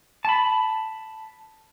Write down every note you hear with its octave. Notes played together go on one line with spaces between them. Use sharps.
A5 B5